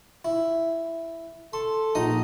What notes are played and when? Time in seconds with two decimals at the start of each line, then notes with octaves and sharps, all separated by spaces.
0.25 E4
1.53 A4 C6
1.95 A#1 D#4 D#5 D#6